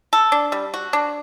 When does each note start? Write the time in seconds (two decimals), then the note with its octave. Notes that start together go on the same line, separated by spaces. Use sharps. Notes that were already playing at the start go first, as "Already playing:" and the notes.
0.13 A4
0.32 D4
0.52 G3
0.74 F#4
0.93 D4